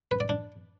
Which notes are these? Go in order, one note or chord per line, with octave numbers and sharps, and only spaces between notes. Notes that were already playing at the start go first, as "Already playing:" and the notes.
B4
D5
D4